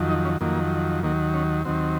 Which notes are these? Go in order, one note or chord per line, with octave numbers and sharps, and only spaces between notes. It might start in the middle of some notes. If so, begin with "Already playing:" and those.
Already playing: F2 D#3 F#3
D#4
C#4
F2 D#3 F#3 A#3
D#2 D#3 F#3 A#3
C#4
D#2 D#3 F#3 C4